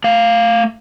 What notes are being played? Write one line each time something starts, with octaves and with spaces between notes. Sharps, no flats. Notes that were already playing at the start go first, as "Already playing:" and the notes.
A3 F5